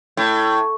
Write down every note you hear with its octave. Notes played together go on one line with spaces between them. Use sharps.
A2